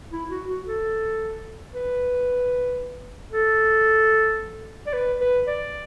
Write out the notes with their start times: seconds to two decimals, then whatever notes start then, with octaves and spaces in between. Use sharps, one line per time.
0.12 E4
0.30 F#4
0.49 F#4
0.66 A4
1.73 B4
3.33 A4
4.87 D5
4.93 B4
5.21 B4
5.47 D5